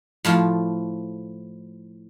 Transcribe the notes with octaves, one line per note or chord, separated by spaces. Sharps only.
A2 F3 F4